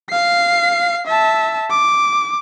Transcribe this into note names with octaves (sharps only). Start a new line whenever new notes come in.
F5 C7
E5 A5
D6